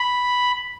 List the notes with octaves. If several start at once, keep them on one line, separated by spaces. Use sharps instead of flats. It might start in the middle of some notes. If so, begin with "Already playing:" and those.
Already playing: B5